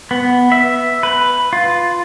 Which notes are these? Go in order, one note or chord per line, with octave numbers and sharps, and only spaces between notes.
B3
E5
B4
F4